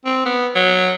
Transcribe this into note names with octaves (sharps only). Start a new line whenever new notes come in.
C4
B3
F#3